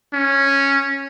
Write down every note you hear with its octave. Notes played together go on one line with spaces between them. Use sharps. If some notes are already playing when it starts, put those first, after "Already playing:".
C#4